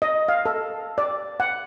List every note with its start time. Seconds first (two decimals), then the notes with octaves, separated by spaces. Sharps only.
0.02 D#5
0.29 F5
0.46 A4
0.98 D5
1.40 F#5